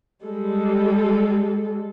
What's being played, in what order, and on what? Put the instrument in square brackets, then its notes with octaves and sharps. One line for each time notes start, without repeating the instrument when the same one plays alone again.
[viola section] G3 G#3 A4